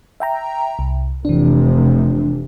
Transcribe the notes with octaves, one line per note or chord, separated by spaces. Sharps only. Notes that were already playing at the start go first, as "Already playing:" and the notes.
E5 G5 A#5
C2
F1 C3 E3 D4